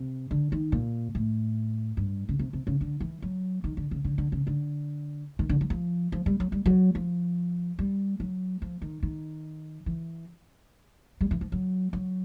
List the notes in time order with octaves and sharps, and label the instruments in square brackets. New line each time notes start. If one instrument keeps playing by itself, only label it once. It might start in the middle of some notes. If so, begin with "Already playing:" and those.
Already playing: [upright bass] C3
D3
D#3
A#2
A2
G2
C#3
C3
C3
C#3
D3
E3
F#3
D#3
D3
C#3
D3
D3
C#3
D3
D#3
D3
F#3
F3
F3
G3
F#3
G3
F#3
F3
G3
F#3
F3
D#3
D#3
E3
G3
E3
F3
F#3
F#3